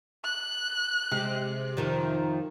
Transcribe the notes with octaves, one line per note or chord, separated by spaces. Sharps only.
F#6
C3 G#3 G4
F2 D#3 F3